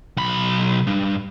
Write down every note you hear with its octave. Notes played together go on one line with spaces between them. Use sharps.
B1 B5
G2